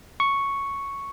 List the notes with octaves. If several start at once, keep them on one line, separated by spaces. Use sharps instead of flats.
C#6